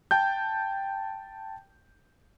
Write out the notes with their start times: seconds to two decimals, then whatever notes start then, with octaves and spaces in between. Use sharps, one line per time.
0.11 G5 A5 G6